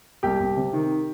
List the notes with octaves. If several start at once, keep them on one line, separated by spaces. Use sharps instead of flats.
C2 G4
C2
C3
D#3